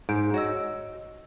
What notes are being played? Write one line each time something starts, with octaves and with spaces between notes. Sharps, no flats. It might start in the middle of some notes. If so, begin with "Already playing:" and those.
G#2 G6 D7
F#4 C#5 D#5 E6